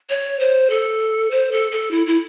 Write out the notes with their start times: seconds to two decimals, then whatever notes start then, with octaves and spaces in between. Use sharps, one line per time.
0.10 C#5
0.39 C5
0.70 A4
1.31 C5
1.52 A4
1.71 A4
1.91 E4
2.07 E4